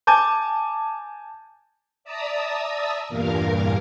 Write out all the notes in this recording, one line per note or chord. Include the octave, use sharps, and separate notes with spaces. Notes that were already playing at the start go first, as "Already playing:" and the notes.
G#5 A5 D6 G6
D5 E5 A5 A#5 D#6 E6
E2 G2 A#2 A#4 F5